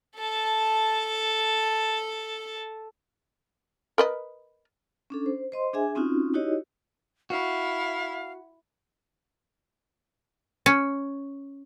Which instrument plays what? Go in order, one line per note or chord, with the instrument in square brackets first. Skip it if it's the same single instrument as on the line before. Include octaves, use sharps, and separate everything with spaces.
[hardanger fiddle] A4 A5
[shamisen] A#4 B4 D#5
[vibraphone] C#4 D4 A4
C5
C5 D#5 C6
D4 G#4 E5 G#5
C4 C#4 D#4 F4 F#4
D#4 E4 F#4 G4 C#5 D#5
[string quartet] E4 [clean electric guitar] F#4 [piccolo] F5
[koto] C#4